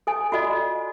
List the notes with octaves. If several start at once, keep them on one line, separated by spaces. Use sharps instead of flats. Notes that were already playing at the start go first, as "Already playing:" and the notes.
A4 G#5
F4 F#4 A4 D5 D#5